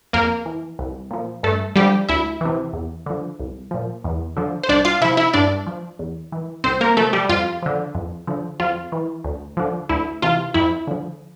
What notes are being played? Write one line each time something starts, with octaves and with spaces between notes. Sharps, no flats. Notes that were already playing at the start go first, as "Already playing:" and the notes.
F2 A#3 A#4
E3
C2
A#2 F3
G2 A3 A4
D3 F3 G3 G4
D2 E4 E5
C3 E3
E2
D3 F3
C2
A#2 F3
E2
D3 F3
C5
C2 D4 D5
F4 F5
C3 F3 E4 E5
E4 E5
G2 D4 D5
F3
E2
E3
C2 C4 C5
A#3 A#4
C3 F3 A3 A4
G3 G4
F2 F4
D3 F3
F2
D3 F3
F2 F4
E3
D2
D3 F3
D2 E4
C3 E3 F4
F2 E4
D3 F3